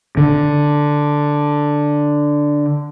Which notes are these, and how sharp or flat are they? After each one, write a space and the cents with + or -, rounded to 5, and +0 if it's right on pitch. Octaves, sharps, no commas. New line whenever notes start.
D3 +0